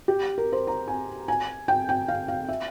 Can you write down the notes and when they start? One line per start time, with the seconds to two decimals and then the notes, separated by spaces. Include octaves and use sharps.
0.08 G4
0.38 A#4
0.52 C5
0.67 A#5
0.88 G#5
1.28 G#5
1.68 G5
1.89 G5
2.08 F5
2.28 F5
2.48 E5